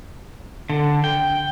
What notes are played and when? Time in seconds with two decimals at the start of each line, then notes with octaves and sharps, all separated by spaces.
0.70 D3
1.04 G5